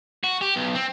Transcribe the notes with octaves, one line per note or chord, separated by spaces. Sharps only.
F#4
G4
B1
C4